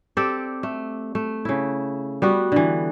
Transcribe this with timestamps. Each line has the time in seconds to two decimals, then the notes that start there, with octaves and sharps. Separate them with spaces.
0.17 C4 G4 A4 D5
0.63 A3
1.15 A3
1.45 C#3 E4
2.22 G3 B3 F#4
2.52 D3 E3